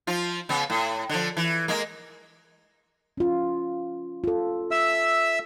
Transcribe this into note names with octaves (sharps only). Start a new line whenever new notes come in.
F3 F4
C#3 B3
A2
D3 F3
E3
G#3 A#3
C#4 F4
F4 A4
E5 E6